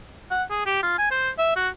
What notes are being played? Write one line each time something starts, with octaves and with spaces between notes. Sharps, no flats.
F#5
G#4
G4
F4
G#5
C5
E5
F#4